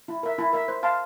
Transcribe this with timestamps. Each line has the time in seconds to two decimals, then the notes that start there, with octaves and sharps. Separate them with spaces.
0.08 E4
0.23 A#4 E5
0.38 E4
0.53 A#4 E5
0.68 C5
0.83 F5 A5 C6